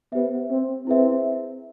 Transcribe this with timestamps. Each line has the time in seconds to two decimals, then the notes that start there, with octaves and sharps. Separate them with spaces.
0.12 B3 G4 C5 E5
0.50 C4
0.87 C4 E4 G#4 B4 E5